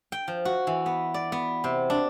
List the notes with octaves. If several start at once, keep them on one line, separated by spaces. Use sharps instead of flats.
G5
F3
F#4
E3
B3
D5
B3
C3
D4